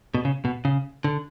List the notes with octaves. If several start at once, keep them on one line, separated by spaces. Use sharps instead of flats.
B2
C#3
B2
C#3
D3